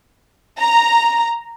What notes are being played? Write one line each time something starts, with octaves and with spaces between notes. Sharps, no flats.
A#5